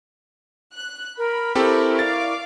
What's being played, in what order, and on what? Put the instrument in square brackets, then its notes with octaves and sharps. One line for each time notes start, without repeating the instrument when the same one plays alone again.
[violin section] F#6
[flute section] A#4 [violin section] B5
[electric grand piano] C4 G4 A4 [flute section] E4 A#4 C#6
[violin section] D5 F5 D6 [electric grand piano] A6